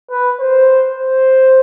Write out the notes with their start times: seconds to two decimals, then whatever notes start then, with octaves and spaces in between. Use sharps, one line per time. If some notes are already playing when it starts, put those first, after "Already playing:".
0.10 B4
0.40 C5
0.98 C5